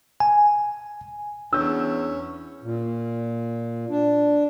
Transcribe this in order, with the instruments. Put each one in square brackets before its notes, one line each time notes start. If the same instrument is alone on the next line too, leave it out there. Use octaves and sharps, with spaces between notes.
[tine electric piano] G#5
[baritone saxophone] E2 [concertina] C#4 [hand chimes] D4 [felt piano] E6 G6
[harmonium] A#2
D4